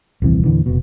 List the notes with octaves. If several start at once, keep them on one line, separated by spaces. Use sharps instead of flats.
D#1 C2 E3 C4
E2 A#2 D3 E3
F1 B2